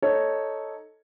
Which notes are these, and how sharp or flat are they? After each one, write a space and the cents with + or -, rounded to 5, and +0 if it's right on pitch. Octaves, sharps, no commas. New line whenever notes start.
D#4 +0 A4 +0 C#5 +0